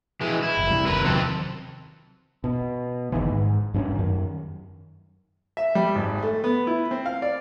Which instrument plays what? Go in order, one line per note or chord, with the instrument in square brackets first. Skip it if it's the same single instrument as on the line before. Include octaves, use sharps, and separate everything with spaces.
[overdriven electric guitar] E3 G#3
E4
[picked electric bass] F#1
C3 G3
[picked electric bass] F#1 D#2 [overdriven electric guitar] A#4 B4
[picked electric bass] C3 D#3 F#3 [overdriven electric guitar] C4 A4
[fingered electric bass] B2
F#1 C#2 D#3 E3
G#2
G2 C4 C#4
F#2 D#3
[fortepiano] E5
G3
G#1
A3
B3
E4
C4
F5
D5